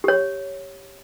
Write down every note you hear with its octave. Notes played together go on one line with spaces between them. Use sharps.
G4 C#5